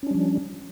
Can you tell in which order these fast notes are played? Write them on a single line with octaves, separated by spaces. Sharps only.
C#4 D4 G3 F3